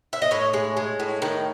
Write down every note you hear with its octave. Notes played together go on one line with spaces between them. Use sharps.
E5
D#5
A2 C#5
G#3
G#3
A2
D#3